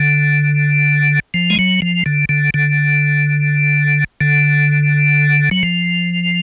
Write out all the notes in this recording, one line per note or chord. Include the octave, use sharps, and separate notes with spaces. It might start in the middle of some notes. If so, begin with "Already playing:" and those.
Already playing: D3
F3
G#3
F#3
F3
D3
D3
D3
D3
F#3
F3